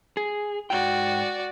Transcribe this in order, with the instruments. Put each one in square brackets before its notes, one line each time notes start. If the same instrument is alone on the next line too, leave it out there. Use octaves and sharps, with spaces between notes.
[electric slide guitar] G#4
[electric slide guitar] G#2 G5 [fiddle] F#4 D5